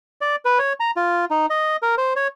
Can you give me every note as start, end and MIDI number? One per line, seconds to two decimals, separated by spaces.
0.21 0.36 74
0.45 0.58 71
0.59 0.73 73
0.80 0.91 82
0.96 1.25 65
1.31 1.46 63
1.50 1.77 75
1.82 1.95 70
1.98 2.13 72
2.16 2.27 73